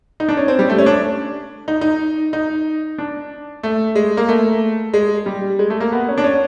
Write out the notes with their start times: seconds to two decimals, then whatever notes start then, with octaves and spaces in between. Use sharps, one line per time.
0.20 D#4
0.29 D4
0.37 C#4
0.48 C4
0.59 G3
0.69 A3
0.78 C#4
0.86 D4
1.68 D#4
1.81 D#4
2.33 D#4
2.98 D4
3.63 A3
3.95 G#3
4.17 A#3
4.28 A3
4.94 G#3
5.26 G3
5.59 G#3
5.70 A3
5.80 A#3
5.92 B3
6.08 C#4
6.18 D4
6.24 C#4